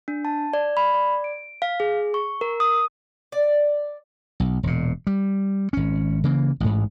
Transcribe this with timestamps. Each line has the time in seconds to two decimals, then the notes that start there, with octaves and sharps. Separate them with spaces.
0.08 D4
0.25 A5
0.53 D5
0.77 B5
0.94 D5
1.24 D7
1.62 F5
1.80 G#4
2.14 C#6
2.41 A#4
2.60 D#6
3.32 D5
4.40 B1
4.63 E1 A#2
5.07 G3
5.73 G#1 C#4
6.24 C#3 E3 A#3
6.60 A1 G#2